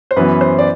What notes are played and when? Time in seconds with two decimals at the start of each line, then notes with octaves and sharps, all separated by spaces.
0.11 C5
0.16 F#2 E3 B3 B4
0.41 C5
0.59 D5